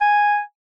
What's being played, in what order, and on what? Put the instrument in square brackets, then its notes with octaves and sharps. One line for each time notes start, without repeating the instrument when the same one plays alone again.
[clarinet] G#5